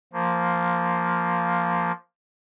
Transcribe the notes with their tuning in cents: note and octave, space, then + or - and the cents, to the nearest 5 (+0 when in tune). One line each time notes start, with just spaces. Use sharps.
F3 +0 A#3 +0